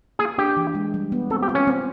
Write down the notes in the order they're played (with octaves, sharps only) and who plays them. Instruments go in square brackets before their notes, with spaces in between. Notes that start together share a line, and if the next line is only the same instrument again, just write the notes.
[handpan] A#3 [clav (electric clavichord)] G#4
[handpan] D4 [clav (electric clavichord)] G4
[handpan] E3
G#3
G3
B3
[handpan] C4 [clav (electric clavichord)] A4
[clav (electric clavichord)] G4
[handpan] F4
[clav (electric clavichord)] C#4
[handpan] C4